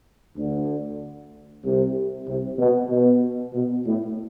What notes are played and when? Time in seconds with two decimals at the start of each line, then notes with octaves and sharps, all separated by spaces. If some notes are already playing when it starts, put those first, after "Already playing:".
0.37 D2 D3
1.64 C2 C3
2.27 C2 C3
2.59 B2
2.90 B2
3.53 B2
3.85 A2